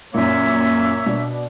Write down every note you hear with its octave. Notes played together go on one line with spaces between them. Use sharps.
F#2 A#2 A#3 C#5 E5
B2 D4